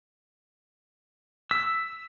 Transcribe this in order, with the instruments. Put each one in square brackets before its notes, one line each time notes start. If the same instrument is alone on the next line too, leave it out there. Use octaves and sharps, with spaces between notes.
[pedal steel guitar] E6 [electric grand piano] B6